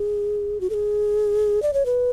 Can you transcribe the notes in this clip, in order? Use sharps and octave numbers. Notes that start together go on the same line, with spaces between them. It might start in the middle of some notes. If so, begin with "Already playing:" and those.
Already playing: G#4
F#4
A4
G#4
D5
C#5
B4